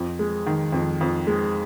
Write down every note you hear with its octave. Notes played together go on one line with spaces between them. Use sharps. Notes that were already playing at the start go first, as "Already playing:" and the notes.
Already playing: F2
G#3
D#3
F2
F2
G#3